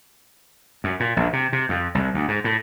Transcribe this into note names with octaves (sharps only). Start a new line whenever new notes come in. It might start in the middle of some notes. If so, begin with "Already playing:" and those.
F#2
A#2
A#1
C3
C3
F2
C2
D2
G#2
A2